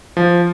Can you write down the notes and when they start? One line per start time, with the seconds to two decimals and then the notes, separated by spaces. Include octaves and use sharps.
0.17 F3